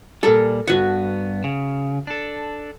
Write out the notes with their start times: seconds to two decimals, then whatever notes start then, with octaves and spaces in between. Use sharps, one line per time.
0.23 A#2 G3 A4 A#4
0.67 G2 B3 F#4 F#5
1.44 C#3
2.07 D4 A4